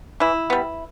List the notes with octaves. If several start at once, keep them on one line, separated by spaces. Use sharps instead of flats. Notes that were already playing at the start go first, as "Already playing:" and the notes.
E3 E4
G3 B3